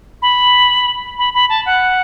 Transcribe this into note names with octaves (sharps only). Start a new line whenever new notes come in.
B5
B5
B5
A5
F#5